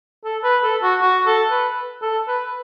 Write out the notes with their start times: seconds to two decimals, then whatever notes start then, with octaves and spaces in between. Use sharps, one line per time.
0.24 A4
0.43 B4
0.63 A4
0.82 F#4
1.01 F#4
1.26 A4
1.51 B4
2.01 A4
2.28 B4